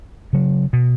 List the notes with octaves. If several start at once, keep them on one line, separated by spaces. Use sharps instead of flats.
C#3 F#3
B2